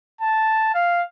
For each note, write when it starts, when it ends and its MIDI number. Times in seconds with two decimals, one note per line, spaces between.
0.21 0.71 81
0.74 1.02 77